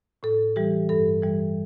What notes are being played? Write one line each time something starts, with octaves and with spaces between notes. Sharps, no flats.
A2 A4
E3 G3 G4
G2 A4
E3 G3